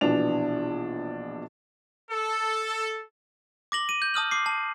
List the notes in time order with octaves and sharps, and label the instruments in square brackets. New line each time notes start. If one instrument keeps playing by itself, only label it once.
[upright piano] A#1 B2 E3 D4 F7
[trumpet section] A4
[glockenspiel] D6 A#6 F#7 G7
D#7
G6
A5 D#6 F6 F#7
D6 C7
A5